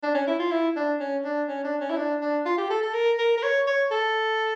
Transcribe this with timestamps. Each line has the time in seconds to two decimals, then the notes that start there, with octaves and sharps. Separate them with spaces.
0.03 D4
0.15 C#4
0.27 E4
0.39 F4
0.51 E4
0.76 D4
1.00 C#4
1.25 D4
1.48 C#4
1.64 D4
1.81 C#4
1.90 E4
1.97 D4
2.22 D4
2.46 F4
2.58 G4
2.70 A4
2.83 A4
2.94 A#4
3.18 A#4
3.38 A#4
3.43 C#5
3.67 C#5
3.91 A4